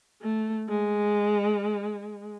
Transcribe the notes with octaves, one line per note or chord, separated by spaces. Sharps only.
A3
G#3